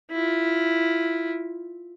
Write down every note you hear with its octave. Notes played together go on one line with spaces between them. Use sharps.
E4 F4